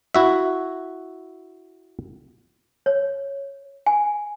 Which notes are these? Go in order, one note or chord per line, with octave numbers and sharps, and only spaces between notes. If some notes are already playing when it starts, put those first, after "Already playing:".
E4 F#4 E5
C#5
G#5